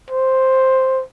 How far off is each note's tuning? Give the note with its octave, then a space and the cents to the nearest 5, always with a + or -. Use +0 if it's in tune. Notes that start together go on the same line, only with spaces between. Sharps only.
C5 +5